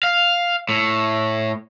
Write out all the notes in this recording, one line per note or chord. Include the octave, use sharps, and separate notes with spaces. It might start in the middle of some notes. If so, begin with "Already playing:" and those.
F5
A2